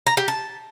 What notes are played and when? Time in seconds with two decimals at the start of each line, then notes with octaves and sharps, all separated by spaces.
0.07 A#5
0.17 G4
0.28 A5